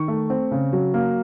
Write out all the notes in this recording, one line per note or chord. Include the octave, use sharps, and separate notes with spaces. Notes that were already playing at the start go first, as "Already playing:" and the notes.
Already playing: D#3 C#6
A3
C4
C#3
F#3
A#3